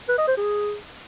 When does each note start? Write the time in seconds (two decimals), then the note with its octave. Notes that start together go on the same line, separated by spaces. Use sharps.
0.08 B4
0.18 D#5
0.28 C5
0.37 G#4